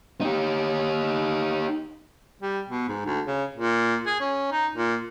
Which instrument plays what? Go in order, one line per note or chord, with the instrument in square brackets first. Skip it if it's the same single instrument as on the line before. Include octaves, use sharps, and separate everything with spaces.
[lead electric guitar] D#4 G4
[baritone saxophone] G3
B2
G#2
D2
C#3
A#2
G#4
C#4
D#4
A#2